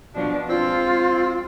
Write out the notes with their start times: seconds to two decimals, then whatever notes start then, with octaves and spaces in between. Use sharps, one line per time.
0.15 B2 F3 D4
0.49 G#3 C4 F4